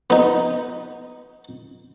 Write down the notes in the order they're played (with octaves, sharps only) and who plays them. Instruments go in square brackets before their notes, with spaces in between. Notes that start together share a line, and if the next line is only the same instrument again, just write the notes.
[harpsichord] B3 D#4